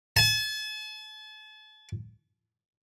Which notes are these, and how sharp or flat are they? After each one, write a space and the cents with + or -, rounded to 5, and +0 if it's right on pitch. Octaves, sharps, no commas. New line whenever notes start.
A5 -40